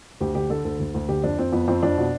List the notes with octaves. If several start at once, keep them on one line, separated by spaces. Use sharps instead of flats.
D2 G4
D3 G4
D3 A4
D2 A4
D2
D2
D3 G4
F2 D4
F2 C4
F2 B3
F2 C4
F2 D4
B2